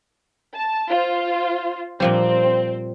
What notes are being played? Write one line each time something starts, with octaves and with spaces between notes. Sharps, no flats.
A5
F4 C5
A#2 F3 G3 C4